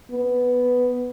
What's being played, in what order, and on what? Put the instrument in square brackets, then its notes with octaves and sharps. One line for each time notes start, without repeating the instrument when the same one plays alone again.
[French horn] B3